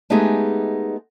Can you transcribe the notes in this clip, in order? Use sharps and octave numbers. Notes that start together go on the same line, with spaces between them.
G#3 A3 B3 D#4 G4 G#4